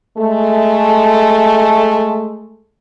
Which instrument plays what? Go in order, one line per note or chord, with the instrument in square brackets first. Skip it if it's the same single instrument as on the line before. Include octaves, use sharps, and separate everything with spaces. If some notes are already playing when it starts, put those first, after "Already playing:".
[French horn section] G#3 A3